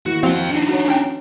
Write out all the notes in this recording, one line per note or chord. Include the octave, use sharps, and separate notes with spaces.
D#3 A#3 E4 F#4
F3 C4 F#4 F5 G5
D4 D#4
F#4 B4 C#5
C#4 G5